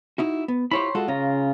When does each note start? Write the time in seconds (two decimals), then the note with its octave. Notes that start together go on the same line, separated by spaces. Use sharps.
0.18 D#4 E4 F#4
0.48 B3
0.71 E4 F4 G4 C5 C#5 B5
0.95 G#3 F4 F#4 A4
1.08 C#3 C#4 F4 A#5